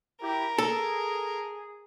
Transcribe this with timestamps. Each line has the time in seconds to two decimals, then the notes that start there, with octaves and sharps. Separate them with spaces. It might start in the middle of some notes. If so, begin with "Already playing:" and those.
0.22 E4 G4 A#4
0.58 G#4 A4